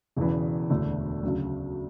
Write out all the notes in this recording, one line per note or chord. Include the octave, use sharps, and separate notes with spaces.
E1 E2 C#3 E3
E1 D2 D3 A3
D2 C#3 F#3